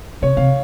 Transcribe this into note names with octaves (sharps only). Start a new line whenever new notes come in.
C3 C#5
C3 F5